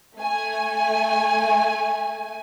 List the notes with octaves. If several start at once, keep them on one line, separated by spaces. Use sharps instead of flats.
A3 G#5